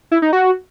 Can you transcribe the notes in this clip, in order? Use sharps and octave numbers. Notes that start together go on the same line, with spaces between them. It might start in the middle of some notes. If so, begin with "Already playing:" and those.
E4
D#4
F#4